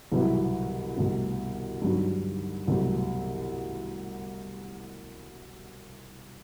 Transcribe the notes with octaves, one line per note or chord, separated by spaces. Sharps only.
C2 B2 F#3 B3 E4
C2 B2 A3 C4
G2 F#3 C4 D#4
C2 B2 F#3 A3 C4